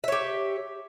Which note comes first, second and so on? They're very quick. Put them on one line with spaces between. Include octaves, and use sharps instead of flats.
E5 C#5 G4